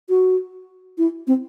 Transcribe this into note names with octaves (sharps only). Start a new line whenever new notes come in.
F#4
E4
C4